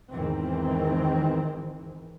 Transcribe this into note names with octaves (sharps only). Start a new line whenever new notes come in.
E2 G#2 D#3 E3 C4